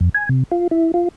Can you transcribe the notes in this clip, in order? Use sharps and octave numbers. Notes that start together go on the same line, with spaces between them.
F2
G#5
C3
F4
E4
F4